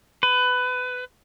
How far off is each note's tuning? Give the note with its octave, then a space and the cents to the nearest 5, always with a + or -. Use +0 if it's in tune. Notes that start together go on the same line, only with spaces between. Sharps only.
B4 +20